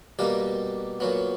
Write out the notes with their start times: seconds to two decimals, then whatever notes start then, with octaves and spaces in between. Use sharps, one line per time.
0.19 B2 G3 A#3 G4
1.00 A#2 F#3 B3